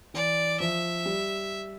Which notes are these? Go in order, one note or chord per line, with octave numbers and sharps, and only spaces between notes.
E3 D5
F3 E5
G3